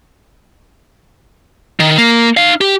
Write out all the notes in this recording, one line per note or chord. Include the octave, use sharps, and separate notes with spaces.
D#3
A#3
D#4 F5
G4